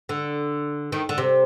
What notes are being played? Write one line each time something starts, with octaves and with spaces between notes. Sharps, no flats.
D3
D#3
D3
C3